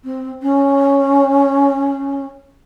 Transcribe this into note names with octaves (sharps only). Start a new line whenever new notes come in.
C4
C#4